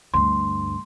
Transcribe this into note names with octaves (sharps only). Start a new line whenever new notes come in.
D2 G2 C6